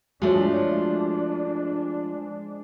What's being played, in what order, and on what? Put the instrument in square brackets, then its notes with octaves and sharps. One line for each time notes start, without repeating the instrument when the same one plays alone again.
[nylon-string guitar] F3 A3 [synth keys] G#3 [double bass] D4 [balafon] F#4 C#5